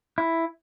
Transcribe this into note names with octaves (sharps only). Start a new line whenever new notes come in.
E4